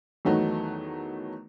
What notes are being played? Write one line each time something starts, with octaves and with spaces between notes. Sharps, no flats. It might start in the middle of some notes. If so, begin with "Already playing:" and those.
E2 D#3 F#3 A3 B3 D#4